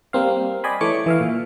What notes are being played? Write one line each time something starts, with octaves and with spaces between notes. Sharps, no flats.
G3 A#3 C4 F5
D5 D#5 G5 G#5 B5 C6
E3 A3 C#5 D6 C#7
E3 E5 F5
A#2